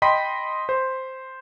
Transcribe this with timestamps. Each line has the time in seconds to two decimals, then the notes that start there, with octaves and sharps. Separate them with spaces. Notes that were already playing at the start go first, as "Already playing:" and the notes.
0.02 D#5 G5 B5 C6 B6
0.69 C5